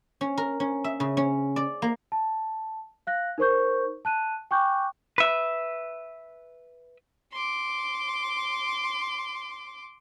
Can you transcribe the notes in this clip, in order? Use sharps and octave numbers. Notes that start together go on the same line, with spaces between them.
C#4
A#4
C#4
E5
C#3
C#4
D5
A#3
A5
F5 F#6 A#6
D#4 A#4 C5 C#6 G6
A5 F#6 D#7
G5 G#5 C#6 D6 F#6 G6
B4 E5
C6 D6